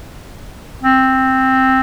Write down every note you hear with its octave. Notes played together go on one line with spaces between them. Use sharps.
C4